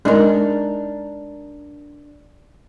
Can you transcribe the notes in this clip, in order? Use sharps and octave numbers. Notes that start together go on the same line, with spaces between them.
G#3 D4 D#4 A#4